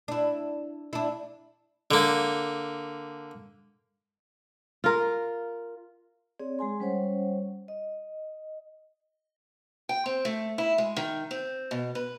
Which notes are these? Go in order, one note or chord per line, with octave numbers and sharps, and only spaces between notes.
D4 E4
D4 E4
D3 A#3
F4 A#4
C4 G#4 C#5 D5
G#3 G#4 G#5 C6
G3 C#4 C5 C#5 F#5
D#5
G5
C4
A3
E4
G#3
D#3
C4
B2
B4